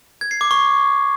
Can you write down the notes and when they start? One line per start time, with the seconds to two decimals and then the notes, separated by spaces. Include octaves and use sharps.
0.21 G#6
0.31 C7
0.41 D6
0.51 C#6